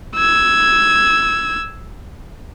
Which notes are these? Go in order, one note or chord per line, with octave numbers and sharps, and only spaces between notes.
E6 G#6